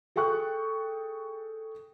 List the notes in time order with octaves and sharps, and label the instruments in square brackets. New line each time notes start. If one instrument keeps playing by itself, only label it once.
[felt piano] G#4 A4 G5 C#6 F#6